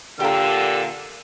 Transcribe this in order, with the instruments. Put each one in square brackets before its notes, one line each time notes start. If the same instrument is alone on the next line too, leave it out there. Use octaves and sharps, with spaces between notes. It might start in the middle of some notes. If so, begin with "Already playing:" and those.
[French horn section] A#2 D3 [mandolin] G4 A#4 [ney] F5 [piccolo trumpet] E6